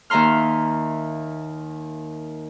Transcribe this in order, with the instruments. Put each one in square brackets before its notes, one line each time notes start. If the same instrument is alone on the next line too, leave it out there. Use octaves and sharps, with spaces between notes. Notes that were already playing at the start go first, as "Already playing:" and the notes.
[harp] D#2 D#3 E5 A#5 C6 F6